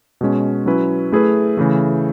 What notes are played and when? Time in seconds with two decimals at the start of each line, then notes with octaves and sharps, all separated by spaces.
0.21 B2 G#3 C#4
0.66 F#3 C#4 E4 B4
1.12 A3 E4 G#4 B4
1.57 C#3 E3 A3